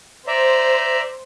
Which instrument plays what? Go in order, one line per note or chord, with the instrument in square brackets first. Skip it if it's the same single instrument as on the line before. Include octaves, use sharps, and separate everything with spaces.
[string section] C5 [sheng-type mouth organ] D5 E5 A#5